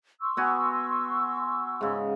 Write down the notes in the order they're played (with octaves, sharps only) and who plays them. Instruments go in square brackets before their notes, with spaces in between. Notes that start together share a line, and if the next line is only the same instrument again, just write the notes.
[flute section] C6 C#6 E6
[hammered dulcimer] B3 F#4 G#5
G#2 C#3